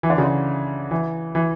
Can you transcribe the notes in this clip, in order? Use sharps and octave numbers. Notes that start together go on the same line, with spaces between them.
E3
D3
C#3
D3
E3
E3